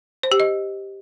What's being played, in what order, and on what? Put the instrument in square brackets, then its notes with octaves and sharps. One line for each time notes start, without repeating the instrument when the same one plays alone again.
[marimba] C5
G4
D#5